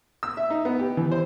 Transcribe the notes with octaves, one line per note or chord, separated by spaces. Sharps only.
E6
E5
D#4
B3
G4
E3
C5